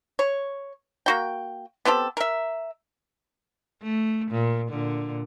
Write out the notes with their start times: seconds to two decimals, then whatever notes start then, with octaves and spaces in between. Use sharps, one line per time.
0.19 C#5
1.06 A#3 F#4 G5
1.85 B3 C4 G4 A4
2.17 A#4 E5
3.83 A3
4.31 A#2
4.69 A#2 D3